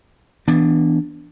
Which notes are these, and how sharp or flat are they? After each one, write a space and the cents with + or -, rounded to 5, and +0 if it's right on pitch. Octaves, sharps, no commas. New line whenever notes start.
E3 -20 B3 +0 D4 +0